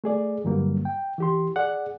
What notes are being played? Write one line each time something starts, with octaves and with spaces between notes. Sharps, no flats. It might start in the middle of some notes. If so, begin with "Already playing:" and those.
A3 G#4 D5
G2 D3 F#3 G3 A#3
G5
E3 G4 C6
G#4 D5 F#5